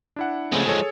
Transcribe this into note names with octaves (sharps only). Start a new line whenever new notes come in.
D4 E4 F#5
C#3 F3 G#3 A3 C4
G#4 A4 C#5